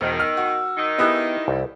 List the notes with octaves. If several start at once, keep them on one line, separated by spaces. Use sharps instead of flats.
E1 D#3 C5
E6 F6
F#4
D#3 D#4
B3 E4 G4 G#4 D#5
C2